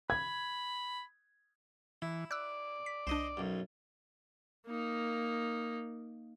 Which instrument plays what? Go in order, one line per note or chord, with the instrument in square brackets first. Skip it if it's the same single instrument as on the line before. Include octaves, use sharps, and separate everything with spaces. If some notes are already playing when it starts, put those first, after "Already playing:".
[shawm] B5 [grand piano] G#6
[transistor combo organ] E3 [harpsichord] E4
[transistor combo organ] D5 [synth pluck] E6 F#6
[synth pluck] B6
[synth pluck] C2 D4 [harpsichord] C5 D#5
[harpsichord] B1 F#2
[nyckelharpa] A#3 D#4